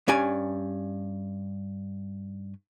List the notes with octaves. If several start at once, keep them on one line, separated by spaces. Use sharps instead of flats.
G2 C#4 D5 G#5